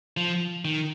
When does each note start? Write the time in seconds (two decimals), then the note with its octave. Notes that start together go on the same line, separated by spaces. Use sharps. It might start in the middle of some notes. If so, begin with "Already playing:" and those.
0.17 F3
0.65 D#3